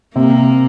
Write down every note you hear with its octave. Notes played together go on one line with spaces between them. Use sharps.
C3 A#3